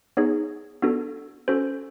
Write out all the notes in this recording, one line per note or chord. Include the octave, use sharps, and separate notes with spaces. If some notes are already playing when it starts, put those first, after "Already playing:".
B3 D#4 G#4 C#5
B3 D4 F#4 A4
C#4 F#4 A4 C5